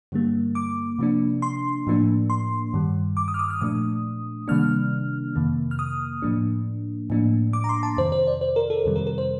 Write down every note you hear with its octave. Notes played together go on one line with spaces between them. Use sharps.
G2 D3 G3 A#3
D6
C3 F3 A#3 D4
C6
A2 F3 A#3 D4
C6
G2 D#3 G3
D6
D#6
F6
D#6
F6
A#2 F3 A3 D4 D#6
C3 D#3 G3 A#3 D4 F6
F2 C3 D#3 A#3
F6
D#6
A2 F3 A#3 D4
A2 F3 A#3 D4
D6
A#5
C6
A5
F2 C3 D#3 C5
C5
D5
C5
A#4
A4
F2 C3 D#3 G3
A#4
A#4
C5